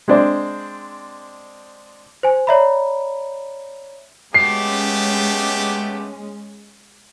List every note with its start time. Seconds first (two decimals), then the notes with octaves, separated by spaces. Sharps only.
0.08 G#3 C4 D4 C5 D5
2.23 C5 G#5
2.47 C#5 D5 E5 A#5 B5
4.34 G#3 A3 B3 C#4 G4 C7